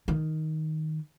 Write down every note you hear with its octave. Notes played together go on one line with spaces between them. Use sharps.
D#3